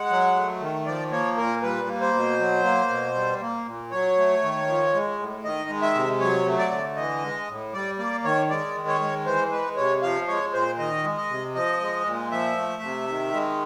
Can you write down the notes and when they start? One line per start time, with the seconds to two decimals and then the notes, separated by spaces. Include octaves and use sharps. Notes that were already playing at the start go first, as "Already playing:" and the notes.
Already playing: G#3 F#5
0.10 F#3
0.36 A3
0.61 D#3
0.86 F3 D5
1.11 A#3 C#5
1.37 A#2 A#4
1.62 G3 B4
1.88 A#3
2.01 C5
2.14 B2
2.39 F#3
2.64 A#3
2.90 B2
3.15 G3
3.41 A#3
3.66 A#2
3.91 F#3 C#5
4.17 A3
4.43 D#3
4.68 F3
4.93 G#3
5.19 A2
5.44 D#3 D#5
5.69 G#3
5.82 E5
5.95 C3
6.20 F#3 C#5
6.46 A3
6.58 D5
6.71 D3
6.96 E3 D#5
7.22 G#3
7.48 A2
7.73 G3 D5
7.98 A#3 D5
8.24 D#3 C#5
8.49 G#3 D5
8.75 D#3
8.88 C#5
9.01 G#3
9.26 E3 C5
9.51 G#3 B4
9.77 C3 C#5
10.02 F3 F5
10.28 G#3 C#5
10.53 A#2 C5
10.78 D#3 D#5
11.04 G#3
11.17 D#5
11.29 C3
11.55 F3 D#5
11.80 G#3
12.05 A#2
12.31 F3 E5
12.57 A3
12.82 C3
13.08 D#3
13.33 G#3